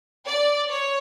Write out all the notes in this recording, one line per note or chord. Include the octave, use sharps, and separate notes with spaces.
D5
C#5